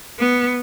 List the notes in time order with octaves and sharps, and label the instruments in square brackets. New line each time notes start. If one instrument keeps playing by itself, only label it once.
[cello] B3